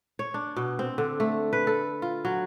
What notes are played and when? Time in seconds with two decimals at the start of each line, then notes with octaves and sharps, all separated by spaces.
0.19 C#5
0.34 D4
0.56 B2
0.79 C4
0.98 D3
1.20 A3
1.53 B4
1.67 A4
2.02 F4
2.25 F#3